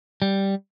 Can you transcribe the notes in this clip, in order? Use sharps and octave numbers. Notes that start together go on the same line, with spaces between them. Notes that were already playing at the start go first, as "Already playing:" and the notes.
G3